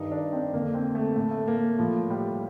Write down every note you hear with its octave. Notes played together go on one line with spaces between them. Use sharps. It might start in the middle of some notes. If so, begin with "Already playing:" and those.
Already playing: G2 D#3 D#4
D4
C4
F2 D3 A#3
C4
A3
A2 A3
A3
A#3
A2 F3
G3